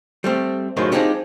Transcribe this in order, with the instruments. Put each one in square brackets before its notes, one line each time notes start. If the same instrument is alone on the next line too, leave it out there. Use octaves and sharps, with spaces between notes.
[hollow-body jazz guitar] G3 A3 C4
F#2 A2 D#3 F3 G#3
F3 G#3 C4 D4 D#4 G4